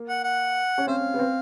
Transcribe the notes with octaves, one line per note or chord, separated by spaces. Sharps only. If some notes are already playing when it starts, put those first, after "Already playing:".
Already playing: A#3
F#5
F#5
C#4
C4 C5 F5
B3
C4